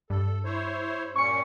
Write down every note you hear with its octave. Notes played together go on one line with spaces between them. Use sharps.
G2 A4
E4 C5 C#5
A#2 G3 C#4 C#6 C#7